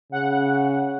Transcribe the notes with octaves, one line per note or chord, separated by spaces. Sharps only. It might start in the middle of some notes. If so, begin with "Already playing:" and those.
C#3 F#5